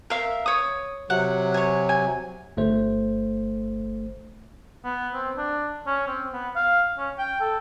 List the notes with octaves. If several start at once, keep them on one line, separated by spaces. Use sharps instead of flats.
A#4 E5 F5
C#5 D#6
C3 F#3 F#5
C#5 G#5
G#5
G1 A3 C5
B3
C4
D4
C#4
C4
B3
F5
C#4
G5
A4